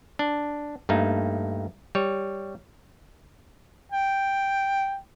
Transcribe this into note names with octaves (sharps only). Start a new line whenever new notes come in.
D4
G2 A3 A#3 D#4
G3 C#5
G5